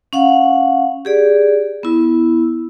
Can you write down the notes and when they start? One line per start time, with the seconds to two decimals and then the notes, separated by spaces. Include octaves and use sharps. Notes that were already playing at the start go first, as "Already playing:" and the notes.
0.13 C#4 F5 F#5
1.05 G4 G#4 D5
1.83 B3 E4